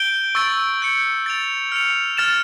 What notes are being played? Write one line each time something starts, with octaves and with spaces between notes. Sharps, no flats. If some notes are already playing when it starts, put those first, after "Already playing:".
Already playing: G6 D7 G7
C#6 E6 A6 D7
C#6 G6 C#7
A6 D7 F7
F6 C#7 F7
F6 A6 E7